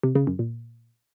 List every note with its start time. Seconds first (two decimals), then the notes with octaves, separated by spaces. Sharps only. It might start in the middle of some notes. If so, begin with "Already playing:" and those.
0.03 C3
0.15 C#3
0.27 F#2
0.39 A#2